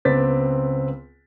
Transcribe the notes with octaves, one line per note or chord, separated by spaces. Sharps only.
C#2 B3 C4 D6 A6 B6